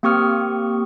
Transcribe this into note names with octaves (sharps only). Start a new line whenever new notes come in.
A#3 C4 G4 C#6 D#6 F6